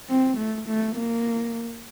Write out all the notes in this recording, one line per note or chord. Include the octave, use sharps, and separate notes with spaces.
C4
A3
A3
A#3